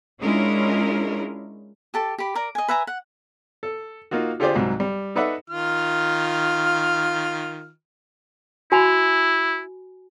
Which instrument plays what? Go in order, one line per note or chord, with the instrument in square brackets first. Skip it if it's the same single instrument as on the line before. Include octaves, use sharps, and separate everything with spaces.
[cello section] G#3 C#4 D4 E4 F4 A#4
[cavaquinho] G4 A4 A5
G4 B5
A#4 D5 A#5
D#5 G#5
B4 E5 G#5 A#5
F#5
[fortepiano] A4
A#3 D#4 F4 F#4
D3 F4 G4 G#4 C5 D5
C2 G#2 F#3
G3
D#4 A4 B4 D5 E5 F#5
[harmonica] D#3 F4 F6
[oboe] E4 [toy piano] F#4 G#5 B5